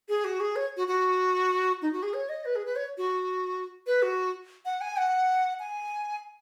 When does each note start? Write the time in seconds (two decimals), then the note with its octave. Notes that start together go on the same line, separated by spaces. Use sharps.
0.09 G#4
0.25 F#4
0.40 G#4
0.56 C#5
0.77 F#4
0.88 F#4
1.82 D#4
1.93 F#4
2.03 G#4
2.14 C#5
2.29 D#5
2.45 B4
2.56 G#4
2.66 B4
2.76 C#5
2.98 F#4
3.87 B4
4.02 F#4
4.65 F#5
4.81 G#5
4.97 F#5
5.60 G#5